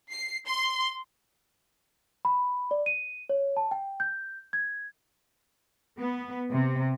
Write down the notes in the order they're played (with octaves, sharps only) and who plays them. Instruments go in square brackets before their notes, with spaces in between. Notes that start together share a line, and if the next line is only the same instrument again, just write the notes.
[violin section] C7
C6
[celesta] B5
D5
D#7
C#5
A5
G5
G6
G#6
[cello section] B3
C3